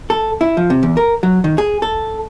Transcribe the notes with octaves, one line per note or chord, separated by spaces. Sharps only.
A4
E4
F3
C3
E2
A#4
F#3
D#3
G#4
A4